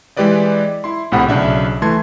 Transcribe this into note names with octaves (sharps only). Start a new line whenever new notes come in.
E3 G#3 G4 B4 D5 D#5
E4 C6
A#1 A2 C3 F#5 B5
B1 C#3 D4 E5
E3 A3 A5 C6 G#6